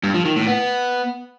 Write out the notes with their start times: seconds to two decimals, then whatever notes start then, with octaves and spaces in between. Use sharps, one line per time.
0.03 G2
0.14 F3
0.25 D#3
0.36 A2
0.47 B3